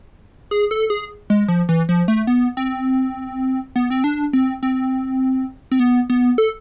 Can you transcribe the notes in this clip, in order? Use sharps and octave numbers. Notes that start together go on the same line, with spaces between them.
G#4
A4
G#4
G#3
F3
E3
F3
A3
B3
C4
B3
C4
D4
C4
C4
C4
B3
B3
A4